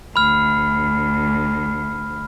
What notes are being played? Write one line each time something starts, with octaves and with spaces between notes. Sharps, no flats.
D2 B5 F6